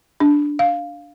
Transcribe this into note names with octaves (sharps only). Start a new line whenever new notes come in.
D4
F5